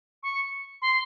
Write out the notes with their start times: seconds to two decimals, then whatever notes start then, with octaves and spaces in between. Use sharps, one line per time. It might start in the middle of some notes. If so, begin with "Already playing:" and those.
0.23 C#6
0.82 C6